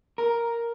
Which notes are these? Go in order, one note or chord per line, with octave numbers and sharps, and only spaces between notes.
A#4